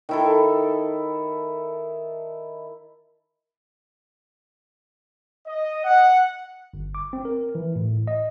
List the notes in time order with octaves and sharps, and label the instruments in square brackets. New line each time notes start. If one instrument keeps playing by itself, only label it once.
[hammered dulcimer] D#3 E4 A4
[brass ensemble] D#5
F#5
[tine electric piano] G1
D6
C4
A#4
E3
A2
D#5